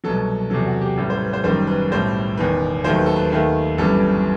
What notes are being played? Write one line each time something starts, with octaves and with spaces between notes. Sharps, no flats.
C2 B2 F#3 A4
E2 C3 F#3 A4
F#4
G4
A1 A2 G3 A4
C5
B4
C5
F#1 F#2 D#3 G3 C5
B4
B1 A2 G3 C5
E1 E2 D#3 B4
D#2 D#3 F#3 A3 C5
B4
A4
B4
D#2 D#3 A3 B4
G1 F#2 E3 G3 A4